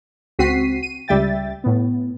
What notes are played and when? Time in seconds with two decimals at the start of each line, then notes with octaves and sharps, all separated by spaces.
0.39 C#2 C4 F#4 B6 C7 D#7
0.83 D#7
1.08 C#2 G3 E5 G5 A6
1.64 A2 B3